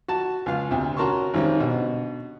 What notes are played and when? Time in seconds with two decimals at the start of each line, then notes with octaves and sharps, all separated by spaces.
0.08 F#4 A5
0.46 C#2 F4 F5
0.71 D2 C3
0.97 C#4 F#4 A#4 A5 C6 C#6
1.34 G#1 D#3 G3 C4 C#4
1.60 B2 D3